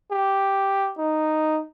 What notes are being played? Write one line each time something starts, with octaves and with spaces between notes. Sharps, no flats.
G4
D#4